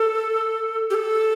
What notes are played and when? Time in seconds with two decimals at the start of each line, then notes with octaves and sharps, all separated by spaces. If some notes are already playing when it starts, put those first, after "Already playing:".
Already playing: A4
0.90 G4
0.94 A4